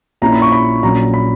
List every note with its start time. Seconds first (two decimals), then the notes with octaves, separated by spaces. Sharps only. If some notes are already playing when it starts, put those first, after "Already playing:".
0.22 A#1 A#2 A#3 C#4 E4 A#5
0.32 B5
0.42 C#6
0.52 B5
0.83 A#1 A#2 F#3 C#4 A#5
1.14 B5